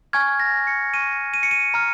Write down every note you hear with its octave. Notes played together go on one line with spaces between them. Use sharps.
G#5 C#6 F6 G#6
A#6
C#7
G#5 C#6 F6 D#7
D#7
C#7
D#7
A#5 F6